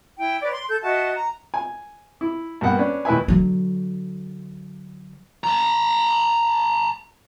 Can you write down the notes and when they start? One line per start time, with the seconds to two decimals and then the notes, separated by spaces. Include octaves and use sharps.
0.17 E4 G5
0.41 B4 C#5 D5
0.54 C6
0.68 A4 G6
0.82 F#4 D#5 E5 A5
1.15 A#5
1.54 G#5
2.21 E4
2.61 G2 A#3 B3 F#5
2.78 C#4 D4 B4
3.05 D#2 E4 B4 E5 G#5
3.28 D3 F#3
5.44 A5 A#5